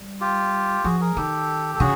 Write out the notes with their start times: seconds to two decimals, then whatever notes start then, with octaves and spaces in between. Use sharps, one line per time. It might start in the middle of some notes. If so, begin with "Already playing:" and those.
Already playing: G3
0.20 F4 G4
0.84 F3 F#4 G#4
1.00 G#4 A#4
1.16 D#3 G4 A4
1.75 A4
1.80 C#3 F#4 G#4